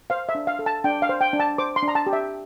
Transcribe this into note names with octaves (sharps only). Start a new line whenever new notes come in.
C5 F5
E5
D4
F5
A4
A5
D4 G5
F5
C5
G5
D4
A5
C5 D6
C6
D4
A#5
A5
G4
E5